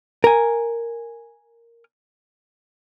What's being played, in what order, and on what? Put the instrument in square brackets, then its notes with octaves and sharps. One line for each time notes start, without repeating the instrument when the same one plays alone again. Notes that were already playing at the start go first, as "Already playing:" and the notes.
[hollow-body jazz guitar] A#4 G#5